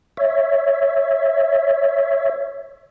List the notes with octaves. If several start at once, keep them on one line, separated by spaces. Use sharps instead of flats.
C#5 E5